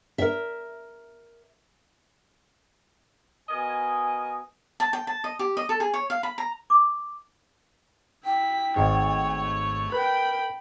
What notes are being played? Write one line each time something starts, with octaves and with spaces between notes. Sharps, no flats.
A#4 E5
B2 A#4 D#5 G#5
A5
G5
A5
D#5
G4
D#5
A4
G#4
C#5
F5
B5
A#5
D6
E4 G5 B6
G#1 G#2 A3 C#5
A#4 B4 G5 B5